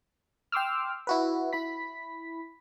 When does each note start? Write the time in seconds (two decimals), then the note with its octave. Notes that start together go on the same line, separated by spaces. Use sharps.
0.52 G5 C6 D6 E6 F6
1.07 E4 F#4 B4
1.53 E4 B5 B6